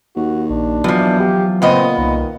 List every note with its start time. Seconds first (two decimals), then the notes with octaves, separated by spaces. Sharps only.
0.16 D#2 F#4
0.50 A#1 D4
0.84 E2 B2 F3 F#3
1.20 G4
1.62 A#2 C#3 B3 C4 D#5
1.98 C2 D#3